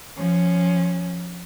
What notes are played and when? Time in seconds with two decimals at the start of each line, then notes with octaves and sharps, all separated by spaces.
0.17 F3 C#4